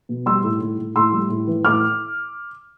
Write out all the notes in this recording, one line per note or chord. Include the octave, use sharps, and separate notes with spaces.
B2
G3 C6 E6
A2
A2
A2
A2 C6 E6
G3
A2
E3
A2 D6 F6